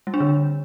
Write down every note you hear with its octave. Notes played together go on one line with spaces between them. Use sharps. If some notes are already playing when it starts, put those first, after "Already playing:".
G3
D4
D3